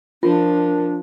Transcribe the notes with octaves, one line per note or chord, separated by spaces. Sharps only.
F3 D4 F4 A#4